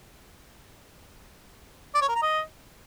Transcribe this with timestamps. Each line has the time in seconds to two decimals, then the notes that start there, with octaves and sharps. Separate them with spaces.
1.95 D5
2.02 C#5
2.08 A#4
2.15 A#5
2.22 D#5